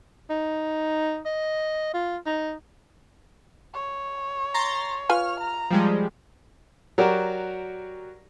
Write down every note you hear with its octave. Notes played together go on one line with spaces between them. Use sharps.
D#4
D#5
F4
D#4
C#5
A#5 C6 A6
F4 B4 G#5 F6
A#5
F3 G3 G#3
F#3 F#4 G4 A#4 D5